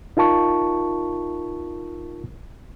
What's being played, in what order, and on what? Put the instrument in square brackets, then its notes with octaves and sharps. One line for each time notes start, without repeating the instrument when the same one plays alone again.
[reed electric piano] D#4 F4 A#4 A5 C#6